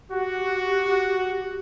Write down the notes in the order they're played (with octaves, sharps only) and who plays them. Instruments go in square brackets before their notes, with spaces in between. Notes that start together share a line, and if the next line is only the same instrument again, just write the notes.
[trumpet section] F#4 [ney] G4